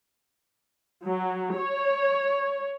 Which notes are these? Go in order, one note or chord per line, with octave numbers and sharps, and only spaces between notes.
F#3
C#5